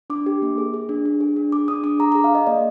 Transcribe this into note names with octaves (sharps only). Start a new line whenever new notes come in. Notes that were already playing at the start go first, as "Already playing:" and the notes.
D4 D6
G4
A#3
G#4
G#4
D4
D4
G#4
D4
G#4 D6
D4 D#6
D4 D6
G#4 A#5
A#5
G#4
F5
G#4 D#5
A#3 D5